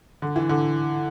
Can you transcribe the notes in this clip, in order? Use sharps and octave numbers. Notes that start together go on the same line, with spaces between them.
D3
E3
D3